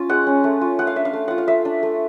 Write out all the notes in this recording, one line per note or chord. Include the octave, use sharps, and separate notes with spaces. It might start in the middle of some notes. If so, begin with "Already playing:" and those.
Already playing: C#4 F4
G#3 F#5
C#4
A3
F4
A3 F#5
F5
D4 E5
F5
A3
F4 F#5
F5
A3 E5
D4
A3